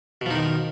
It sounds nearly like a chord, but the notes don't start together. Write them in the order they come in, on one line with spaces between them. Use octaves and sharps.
B2 F3 D#4 D#3